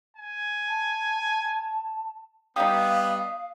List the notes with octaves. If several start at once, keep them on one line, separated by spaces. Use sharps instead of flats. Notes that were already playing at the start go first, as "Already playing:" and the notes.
G#5
A5
G3 B3 D#4 G4 F5 D#6